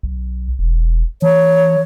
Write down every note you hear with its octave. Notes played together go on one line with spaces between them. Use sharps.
B1
E1
E3 C#5